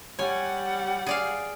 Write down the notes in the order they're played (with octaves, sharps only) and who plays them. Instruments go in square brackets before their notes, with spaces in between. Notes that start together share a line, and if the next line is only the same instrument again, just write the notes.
[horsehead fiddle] G3 F#5 [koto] C#5 G#5
[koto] G#4 D5 F5